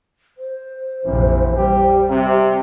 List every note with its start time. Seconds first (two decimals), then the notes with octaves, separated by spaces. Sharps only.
0.38 C5
1.05 A#1 F2 C3 E3
1.55 G3 G4
2.09 C3